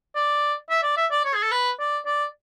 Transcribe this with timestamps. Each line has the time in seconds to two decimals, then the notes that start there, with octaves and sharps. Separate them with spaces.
0.16 D5
0.70 E5
0.83 D5
0.97 E5
1.11 D5
1.25 C#5
1.35 G#4
1.43 A4
1.52 B4
1.80 D5
2.06 D5